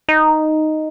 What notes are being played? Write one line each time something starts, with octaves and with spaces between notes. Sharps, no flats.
D#4